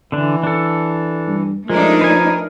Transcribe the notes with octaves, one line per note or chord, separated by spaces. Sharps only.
D3 E3 D4
D4 A4
G2
F3 G#3 A3 D4 D#4 A#4
B4 G#5